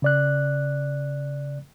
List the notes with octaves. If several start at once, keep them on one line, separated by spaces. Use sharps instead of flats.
C#3 D5 F#6